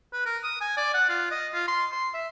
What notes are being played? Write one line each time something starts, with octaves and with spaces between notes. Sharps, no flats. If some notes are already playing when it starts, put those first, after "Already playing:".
B4
A#4
D#6
G#5
D5
F#5
F4
D#5
F4
C6
C6
E5